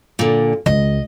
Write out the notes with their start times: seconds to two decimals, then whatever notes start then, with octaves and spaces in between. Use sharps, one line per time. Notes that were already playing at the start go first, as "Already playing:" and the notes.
0.19 A#2 D3
0.66 C#2 D#5